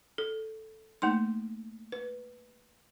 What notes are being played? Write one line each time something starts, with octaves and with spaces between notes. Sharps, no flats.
A4
A3 A#3 D#4 C6
B4